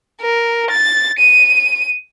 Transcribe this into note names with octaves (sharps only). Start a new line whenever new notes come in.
A#4
A6
D#7